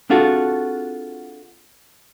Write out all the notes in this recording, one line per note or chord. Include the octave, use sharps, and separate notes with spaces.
C4 D4 F4 F#4 G#4 A4